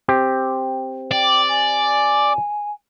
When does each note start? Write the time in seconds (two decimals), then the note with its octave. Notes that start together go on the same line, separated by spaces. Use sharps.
0.08 C4 G4
1.11 D5 G5
1.48 G#5